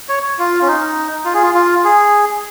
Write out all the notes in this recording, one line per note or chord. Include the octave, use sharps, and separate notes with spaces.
C#5
F4
C#4
D#4
F4
G#4
F4
F4
G#4